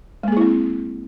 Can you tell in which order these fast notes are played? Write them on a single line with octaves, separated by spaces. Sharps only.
G#3 A#3 G#4 E4 C4